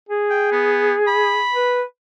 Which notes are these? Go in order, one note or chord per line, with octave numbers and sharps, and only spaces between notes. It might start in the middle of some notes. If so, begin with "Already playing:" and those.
G#4
G5
B3
B5
B4